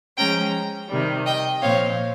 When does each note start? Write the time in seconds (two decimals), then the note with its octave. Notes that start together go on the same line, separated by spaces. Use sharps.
0.17 F3 G#3 C#4 G5 A#5
0.89 C3 D#3 G3
1.25 D#5 G5
1.61 A#2 F3 C4 C#5 F5